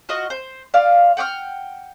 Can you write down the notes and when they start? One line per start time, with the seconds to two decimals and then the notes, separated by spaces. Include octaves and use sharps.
0.09 F4 F#4 D#5
0.30 C5
0.74 F4 D5 F5
1.17 F#5 G5 D6 F6